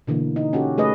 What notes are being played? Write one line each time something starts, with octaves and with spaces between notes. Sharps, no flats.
B2 D3 E3 A#3
D#4
C#4 F#4 G4 A4
A3 G#4 B4 D#5